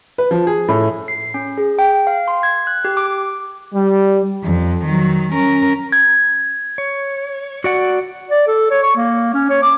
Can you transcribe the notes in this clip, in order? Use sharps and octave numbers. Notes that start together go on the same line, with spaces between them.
B4
F3
G#4
A2
C7
C#4
G#4
G5
F5
C6
G#6
F#6
G4
D6
G3
F2
D#3 F#3
C#4 A#4
G#6
C#5
F#4 D5 F#5
D5
A4
C#5
C#6
A#3
C#4
C#5
D6